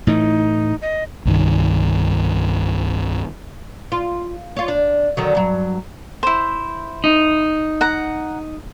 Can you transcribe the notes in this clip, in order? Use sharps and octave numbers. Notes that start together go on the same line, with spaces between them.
A2 E3 A3 D#4
D#5
C2 G2 D#3
F4
F4 C#5
D4
D3 D#3 F#3
G2 F#3
E4 C5
D#4
F#5 A#5